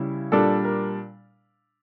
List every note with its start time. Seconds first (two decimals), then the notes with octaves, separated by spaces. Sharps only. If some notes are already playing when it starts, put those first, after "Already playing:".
Already playing: C#3 G3 E4
0.32 A#2 G3 D4 A4
0.65 A#4